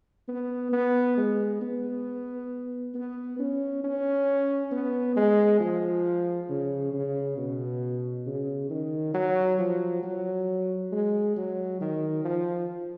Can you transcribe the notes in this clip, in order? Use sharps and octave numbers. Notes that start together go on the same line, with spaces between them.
B3
B3
G#3
B3
B3
C#4
C#4
B3
G#3
F3
C#3
C#3
B2
C#3
D#3
F#3
F3
F#3
G#3
F#3
D#3
F3